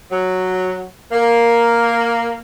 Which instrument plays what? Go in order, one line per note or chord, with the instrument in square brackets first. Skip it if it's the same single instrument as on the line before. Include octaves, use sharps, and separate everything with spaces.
[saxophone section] F#3
[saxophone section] A#3 [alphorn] A#4